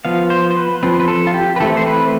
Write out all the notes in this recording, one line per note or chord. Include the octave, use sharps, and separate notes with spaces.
F3 B3 F5
C5
C5
B4
F3 C4 B4
B4
A4
F4
G4
B4
E3 A3 C4 A4
C5
B4